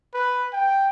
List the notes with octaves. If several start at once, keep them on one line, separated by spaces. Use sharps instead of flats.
B4
G5